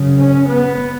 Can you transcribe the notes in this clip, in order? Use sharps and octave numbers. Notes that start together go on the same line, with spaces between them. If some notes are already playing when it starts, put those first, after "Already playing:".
Already playing: F#2 C#3
C#4
B3